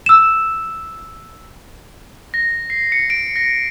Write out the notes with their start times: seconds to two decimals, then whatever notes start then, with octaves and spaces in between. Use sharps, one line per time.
0.06 E6 E7
2.34 A#6
2.70 C7
2.92 C#7
3.10 D7
3.36 A#6